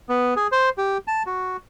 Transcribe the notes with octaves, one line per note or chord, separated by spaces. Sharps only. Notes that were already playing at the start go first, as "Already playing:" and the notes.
B3
G#4
C5
G4
A5
F#4